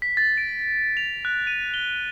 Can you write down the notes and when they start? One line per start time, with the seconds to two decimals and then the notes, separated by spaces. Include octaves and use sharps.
0.02 B6
0.17 A6
0.37 D7
0.97 F7
1.25 F#6
1.47 D#7
1.74 G7